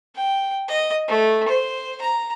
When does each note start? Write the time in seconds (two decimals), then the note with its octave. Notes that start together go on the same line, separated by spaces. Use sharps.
0.16 G5
0.68 D#5
1.08 A3
1.48 C5
2.01 A#5